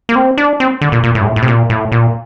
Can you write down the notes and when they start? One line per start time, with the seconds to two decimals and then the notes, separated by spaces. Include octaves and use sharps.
0.09 A#3
0.16 C4
0.38 D4
0.60 C4
0.81 D3
0.92 A#2
1.04 A#2
1.15 A2
1.21 G2
1.25 A2
1.36 A2
1.42 C3
1.48 A#2
1.70 A2
1.92 A#2